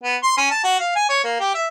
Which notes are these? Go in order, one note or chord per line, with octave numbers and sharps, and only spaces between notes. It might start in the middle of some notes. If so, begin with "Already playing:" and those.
B3
C6
C#4
A5
F#4
F5
G#5
C#5
A#3
G4
E5